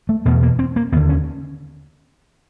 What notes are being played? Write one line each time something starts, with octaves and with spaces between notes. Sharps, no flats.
A3
E2 B2 B3
A#3
C4
A#3
D#2 D3 B3
C#4